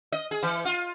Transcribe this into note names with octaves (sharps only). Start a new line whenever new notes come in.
D#5
G#4
E3
F4